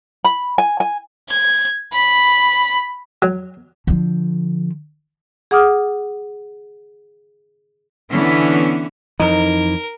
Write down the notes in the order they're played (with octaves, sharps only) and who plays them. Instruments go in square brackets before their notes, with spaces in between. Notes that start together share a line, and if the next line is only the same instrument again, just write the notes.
[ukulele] B5
G#5
G#5
[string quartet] G#6
B5
[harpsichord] F#3
[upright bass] D3 F3
[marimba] G#4 F#5 D6 D#6 F6
[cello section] D3 E3 B3 C#4
[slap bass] F2 E3 [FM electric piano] D#4 [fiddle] A#4